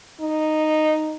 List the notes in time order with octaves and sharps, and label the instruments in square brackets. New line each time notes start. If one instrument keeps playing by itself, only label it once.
[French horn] D#4